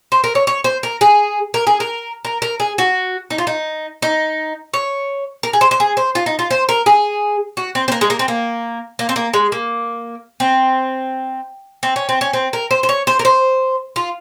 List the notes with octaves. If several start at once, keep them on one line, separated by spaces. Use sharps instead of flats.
C5
A#4
C#5
C#5
C5
A#4
G#4
A#4
G#4
A#4
A#4
A#4
G#4
F#4
D#4
F4
D#4
D#4
C#5
A#4
G#4
C5
C5
G#4
C5
F4
D#4
F4
C5
A#4
G#4
F#4
C4
C4
A#3
G#3
A#3
C4
A#3
A#3
C4
A#3
G#3
A#3
C4
C4
C#4
C4
C#4
C4
A#4
C5
C5
C#5
C5
A#4
C5
F4